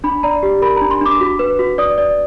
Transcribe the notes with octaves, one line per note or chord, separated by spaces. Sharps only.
D4 B5
D5 A#5
G4
A#4 B5
A#5
D4
C6
D4 D6
F#4
B4
F#4
D5 D#6
D5